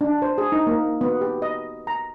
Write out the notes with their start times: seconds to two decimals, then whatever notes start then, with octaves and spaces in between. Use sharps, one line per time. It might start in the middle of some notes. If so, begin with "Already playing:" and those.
0.01 D4
0.22 C5
0.38 G#4
0.52 D#4
0.67 A#3
1.01 B3
1.21 G4
1.42 D#5
1.87 A#5